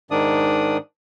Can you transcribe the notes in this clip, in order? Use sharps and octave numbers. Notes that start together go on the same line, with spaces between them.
G#2 D#3 D4 D5 D#6